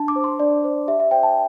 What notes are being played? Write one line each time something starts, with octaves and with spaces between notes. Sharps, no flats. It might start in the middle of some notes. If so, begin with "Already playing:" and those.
Already playing: D4 A5
D6
C5
C6
D4 D5
C5
G4 E5
E5
C5 G5
A5